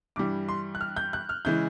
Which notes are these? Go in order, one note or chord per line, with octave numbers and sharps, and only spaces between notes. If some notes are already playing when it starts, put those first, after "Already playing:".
G2 E3 G3 D6
C6
F#6
F6
G6
F#6
F6
C#3 E3 G#3 G6